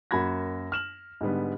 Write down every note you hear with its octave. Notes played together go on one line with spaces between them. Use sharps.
F#2 A#3 F#4 B5 G#6 A#6
F6 E7 F#7
G#2 D3 G3 B3